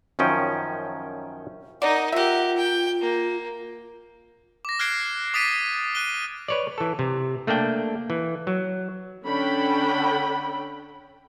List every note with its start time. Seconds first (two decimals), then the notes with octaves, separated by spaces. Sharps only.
0.19 F#2 D#3 F3 C#4 G5
1.82 D#4 A#4 D5 F#5
2.12 F4 G4 A#4 E5 F#5
2.57 G5
3.01 A#3
4.65 D6 A#6
4.79 F6 F#6 G#6 C7 D7
5.34 D6 D#6 A6 B6 D7 D#7
5.95 F#6 D#7 G7
6.48 B4 C#5 D5
6.78 E3 A4
6.99 C3
7.47 A3 A#3 D4 D5 G5
8.10 E3
8.47 F#3
9.26 D3 C#4 D4 G5 B5